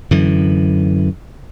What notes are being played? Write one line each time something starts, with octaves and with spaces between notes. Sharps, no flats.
F#2 D3 E3